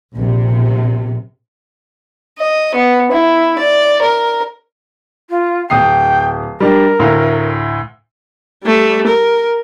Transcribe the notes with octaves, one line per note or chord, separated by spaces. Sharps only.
A#1 C3
D#5
B3
E4
D5
A#4
F4
D1 G5 D#6 C7
G3 D4 G4 A#4
D2 A2 F5
G3 A3
A#4